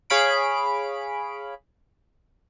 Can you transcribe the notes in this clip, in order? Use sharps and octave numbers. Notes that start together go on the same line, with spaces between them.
G#4 C#5 F5 B5 D7